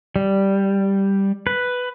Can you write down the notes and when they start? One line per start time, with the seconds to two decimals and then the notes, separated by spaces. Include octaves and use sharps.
0.16 G3
1.47 B4